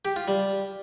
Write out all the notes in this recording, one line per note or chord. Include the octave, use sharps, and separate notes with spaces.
G4
F4
G3